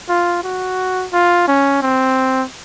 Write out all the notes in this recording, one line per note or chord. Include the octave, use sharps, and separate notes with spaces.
F4
F#4
F4
C#4
C4